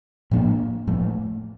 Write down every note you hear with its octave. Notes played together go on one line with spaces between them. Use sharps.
A2 F3 A#3 D4
A2 F3 A3